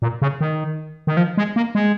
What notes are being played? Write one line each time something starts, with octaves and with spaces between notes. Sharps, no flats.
A#2
C#3
D#3
D#3
F3
G#3
A#3
G#3